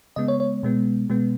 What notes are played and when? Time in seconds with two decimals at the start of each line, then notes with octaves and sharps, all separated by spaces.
0.16 C#3 G#3 B3 D#5
0.28 C#5
0.40 C#5
0.63 B2 G#3 B3
1.10 B2 G#3 B3